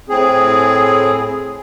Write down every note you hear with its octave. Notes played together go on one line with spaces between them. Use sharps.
A2 C4 G#4